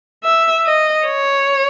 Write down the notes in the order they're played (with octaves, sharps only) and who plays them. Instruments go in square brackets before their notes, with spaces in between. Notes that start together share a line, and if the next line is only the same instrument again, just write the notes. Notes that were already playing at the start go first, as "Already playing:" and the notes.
[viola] E5
D#5
C#5